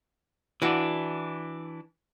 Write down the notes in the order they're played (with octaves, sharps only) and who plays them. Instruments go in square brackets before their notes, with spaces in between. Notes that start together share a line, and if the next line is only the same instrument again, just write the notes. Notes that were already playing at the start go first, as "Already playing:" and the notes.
[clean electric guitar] E3 D4 [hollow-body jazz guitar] E4 F#4 F#5